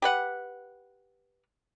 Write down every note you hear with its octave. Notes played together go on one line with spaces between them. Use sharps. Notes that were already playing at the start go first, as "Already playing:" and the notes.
G4 B4 F#5